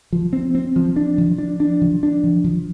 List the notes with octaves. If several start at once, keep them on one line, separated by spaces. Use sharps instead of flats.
F3
C4
C4
F3
D4
F3
D4
D4
F3
D4
F3
F3